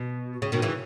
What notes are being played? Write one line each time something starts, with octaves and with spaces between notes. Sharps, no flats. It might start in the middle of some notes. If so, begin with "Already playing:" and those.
Already playing: B2
C#3
B2 D#3
C#3 E3